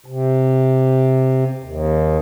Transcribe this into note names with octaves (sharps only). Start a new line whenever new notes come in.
C3
D#2